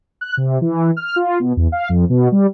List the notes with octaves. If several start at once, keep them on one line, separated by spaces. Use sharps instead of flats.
F#6
C3
E3
F6
F4
B2
E2
F5
F2
B2
G3